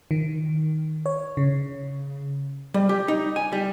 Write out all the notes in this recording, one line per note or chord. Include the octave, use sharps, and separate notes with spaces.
D#3
C#5
C#3
G3
G4
D#4
G#5
G3